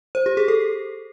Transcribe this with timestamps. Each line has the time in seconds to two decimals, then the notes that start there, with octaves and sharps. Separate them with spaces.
0.15 C5
0.26 G4
0.37 G#4
0.48 A4